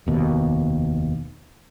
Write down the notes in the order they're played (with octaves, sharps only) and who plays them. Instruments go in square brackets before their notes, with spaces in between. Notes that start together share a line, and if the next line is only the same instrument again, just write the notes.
[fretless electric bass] F1 D#2 B2